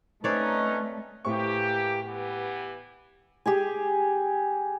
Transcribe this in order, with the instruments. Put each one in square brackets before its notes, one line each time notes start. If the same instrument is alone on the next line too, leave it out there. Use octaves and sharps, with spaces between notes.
[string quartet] A3 [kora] C4 C#5 D5 [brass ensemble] C#4 D#4 [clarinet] B4
[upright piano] A2 C5 C#6 [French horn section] E3 A#3 G4
[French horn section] E3 B3 G4
[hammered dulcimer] G4 G#4 G#5